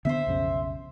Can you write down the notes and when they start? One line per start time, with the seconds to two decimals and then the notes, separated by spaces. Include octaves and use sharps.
0.05 D3 B3 C5 E5
0.27 B1 F2 C#3